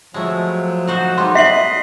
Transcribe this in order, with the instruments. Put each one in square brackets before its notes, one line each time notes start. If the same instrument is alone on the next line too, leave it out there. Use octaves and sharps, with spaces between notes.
[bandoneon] F3 F#3 [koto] G#3 A3
[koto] D#4 F#4 C5
[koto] G3 B3 [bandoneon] G#3 D#4 [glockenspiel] C6
[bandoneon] D#5 [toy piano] E5 [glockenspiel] B6 C7 F#7